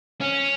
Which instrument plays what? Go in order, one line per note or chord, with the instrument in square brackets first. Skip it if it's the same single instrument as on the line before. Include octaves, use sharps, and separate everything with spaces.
[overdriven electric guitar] C#4